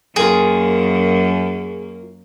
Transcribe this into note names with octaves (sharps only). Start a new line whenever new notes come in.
F#2 A#3 F4 G#4 A#4 G5